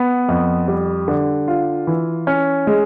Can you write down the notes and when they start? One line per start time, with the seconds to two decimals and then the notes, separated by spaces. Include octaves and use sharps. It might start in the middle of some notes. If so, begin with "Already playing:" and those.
Already playing: B3
0.29 F2
0.68 G3
1.08 D3
1.48 F4
1.87 E3
2.27 C#4
2.67 G#3